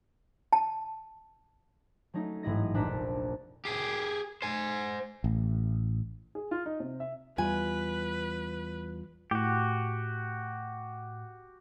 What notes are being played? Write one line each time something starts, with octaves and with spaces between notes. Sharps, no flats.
A5
F#3 A3 C#4 D#4
A1 G#2 E4 G#4 D#5 A#6
F1 A#1 D4 A#5 F#6 B6
G4 G#4
C5 G#5
A1
G#4
F4
D#4
C3
E5
E2 G3 F4 B4 G#5
A2 F#4 G4